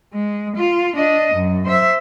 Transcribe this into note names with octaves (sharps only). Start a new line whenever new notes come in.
G#3
F4
D4 D#5
F#2
C5 E5